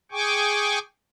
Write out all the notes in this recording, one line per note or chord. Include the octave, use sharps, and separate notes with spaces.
G#4 G5 G#5 C#6 D6